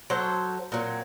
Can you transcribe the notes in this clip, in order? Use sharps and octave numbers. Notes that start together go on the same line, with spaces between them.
F#3 A4 C5 C#5
A#2 F#3 C4